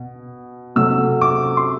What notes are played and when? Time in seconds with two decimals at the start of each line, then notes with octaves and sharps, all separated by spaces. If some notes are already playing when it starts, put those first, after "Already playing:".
Already playing: B2
0.76 C3 F#3 A3 E6
1.21 D6
1.57 C6